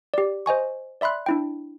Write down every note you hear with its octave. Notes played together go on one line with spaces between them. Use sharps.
G4 D5
C5 D#5 G#5 C#6
D5 E5 B5 C6 F#6
D4 E4 G5